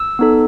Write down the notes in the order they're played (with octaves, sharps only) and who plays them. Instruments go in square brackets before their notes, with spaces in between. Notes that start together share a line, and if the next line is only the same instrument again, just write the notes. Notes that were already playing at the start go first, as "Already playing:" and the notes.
Already playing: [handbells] E6
B3 D#4 A4